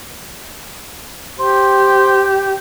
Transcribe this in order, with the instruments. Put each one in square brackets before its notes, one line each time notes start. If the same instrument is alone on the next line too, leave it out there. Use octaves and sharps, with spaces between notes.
[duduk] G4 [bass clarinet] C5